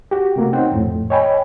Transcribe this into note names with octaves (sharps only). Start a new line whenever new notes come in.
F#4 G4
C3 A3 A#3 F#4
C4 C#4 D#4 C5 F#5 G5
F2 A2
C#5 D#5 G5 G#5 B5